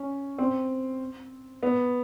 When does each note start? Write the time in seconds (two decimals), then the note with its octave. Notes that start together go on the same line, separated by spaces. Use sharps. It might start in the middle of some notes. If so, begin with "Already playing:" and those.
Already playing: C#4
0.38 C4
1.63 B3